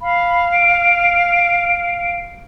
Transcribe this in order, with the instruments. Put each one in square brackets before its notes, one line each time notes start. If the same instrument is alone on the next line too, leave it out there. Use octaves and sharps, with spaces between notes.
[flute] F5 [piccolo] B5
[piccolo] D7